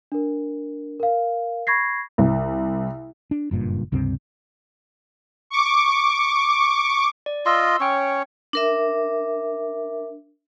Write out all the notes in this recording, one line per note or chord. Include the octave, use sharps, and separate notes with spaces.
D4 A#4
A#4 F5
B5 C#6 G#6 A#6 C7
C2
D4
F#1 G2 A#2
C#2 G2 C3 C4
C#6 D6
D5
F4 D#5 C6 E6
C#4 C#5 G5 C#6
D4 A#4 E5